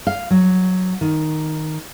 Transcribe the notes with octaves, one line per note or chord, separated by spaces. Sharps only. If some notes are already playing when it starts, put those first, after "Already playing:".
F5
F#3
D#3